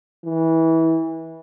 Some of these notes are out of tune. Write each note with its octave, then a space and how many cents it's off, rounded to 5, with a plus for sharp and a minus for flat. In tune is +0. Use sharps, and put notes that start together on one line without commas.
E3 -20